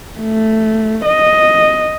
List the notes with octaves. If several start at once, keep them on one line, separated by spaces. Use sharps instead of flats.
A3
D#5